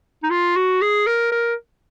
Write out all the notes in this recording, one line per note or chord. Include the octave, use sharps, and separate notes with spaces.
D#4
F4
F#4
G#4
A#4
A#4